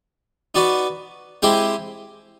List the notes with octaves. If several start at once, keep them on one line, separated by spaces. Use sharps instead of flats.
B3 D#4 F#4 B4 D5
G#3 C4 E4 G4 C5